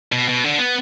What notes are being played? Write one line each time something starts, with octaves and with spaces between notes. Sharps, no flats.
B2
B2
D3
B3